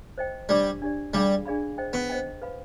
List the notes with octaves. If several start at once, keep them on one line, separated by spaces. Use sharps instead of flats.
C5 D#5 G5
G3 D4 G4 D5
D4 G4 D5
G3 D4 G#4 D5 F5 B5
D4 G#4 D5 F5 B5
C5 D#5 G5
B3
C5 D#5 G5
B4 F5 B5